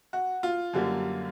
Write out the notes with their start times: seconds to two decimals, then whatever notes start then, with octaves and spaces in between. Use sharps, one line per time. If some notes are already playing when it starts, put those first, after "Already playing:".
0.13 F#4
0.43 F4
0.73 F#2 D3 G3 A#3